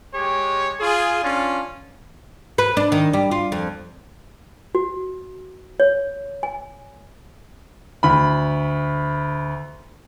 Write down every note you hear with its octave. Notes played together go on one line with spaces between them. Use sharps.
G#3 G4 C#5
F4 G#4
C#4 D4 F4
B4
D4
D#3
G3
F4
F2
F#4
C#5
G#5
D2 B5